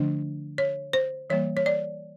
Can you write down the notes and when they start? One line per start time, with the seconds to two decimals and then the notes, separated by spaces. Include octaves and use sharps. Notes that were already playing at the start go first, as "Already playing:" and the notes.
Already playing: D3 F3 A3 D4
0.58 C#5
0.93 C5
1.30 E3 G3 A#3 C#5
1.57 C#5
1.66 D5